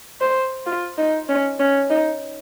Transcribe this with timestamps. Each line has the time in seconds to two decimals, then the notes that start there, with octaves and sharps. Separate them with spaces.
0.21 C5
0.66 F4
0.98 D#4
1.29 C#4
1.60 C#4
1.90 D#4